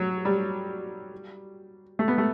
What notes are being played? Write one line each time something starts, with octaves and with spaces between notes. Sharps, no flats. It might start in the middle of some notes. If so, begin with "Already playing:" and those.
Already playing: F#3
G3
A3
B3
A3